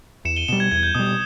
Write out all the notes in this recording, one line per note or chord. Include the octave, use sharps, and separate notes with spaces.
E2 C#7 E7
D#7 G7
B2 G3 C#7 E7
G#6
E2 G#6
G6
B2 G3 D#6
D#6